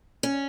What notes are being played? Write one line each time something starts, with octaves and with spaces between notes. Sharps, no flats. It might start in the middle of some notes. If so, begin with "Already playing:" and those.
C#4